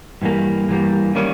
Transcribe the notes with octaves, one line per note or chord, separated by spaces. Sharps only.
G2 E3 G3 A#3
G2 E3 G3 A#3
D#3 G3 A#3 C#4